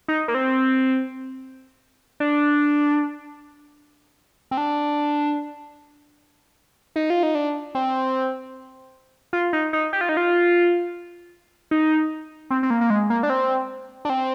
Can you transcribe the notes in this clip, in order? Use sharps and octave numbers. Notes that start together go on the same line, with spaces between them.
D#4
A#3
C4
D4
C4
D4
D#4
F4
D#4
D4
C4
F4
D#4
D#4
G4
F4
D#4
F4
D#4
C4
C4
A#3
A#3
G#3
A#3
D4
C4
D4
C4